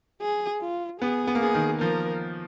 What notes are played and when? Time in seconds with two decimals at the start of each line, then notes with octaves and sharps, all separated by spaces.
0.22 G#4
0.61 F4
1.01 B3 G#4
1.27 B3
1.35 A#3
1.42 B3 G#4
1.54 D#3
1.81 F3 A#4